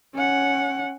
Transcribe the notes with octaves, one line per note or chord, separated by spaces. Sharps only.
C#4 F#5